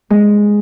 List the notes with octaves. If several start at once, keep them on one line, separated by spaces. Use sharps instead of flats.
G#3